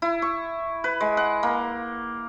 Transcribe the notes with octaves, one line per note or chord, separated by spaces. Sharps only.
E4
C#6
B4
G#3
F#5
A#3